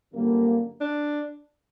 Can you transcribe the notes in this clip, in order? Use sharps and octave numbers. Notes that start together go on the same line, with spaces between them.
G1 F#2 D3 G3 A#3
D4